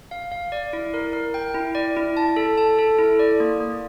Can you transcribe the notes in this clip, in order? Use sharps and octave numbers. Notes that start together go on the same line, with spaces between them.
F5
F5
D5
E4
A#4
A#4
G5
E4
D5
E4
A5
A4
A5
A4
E4
D5
A#3
A#3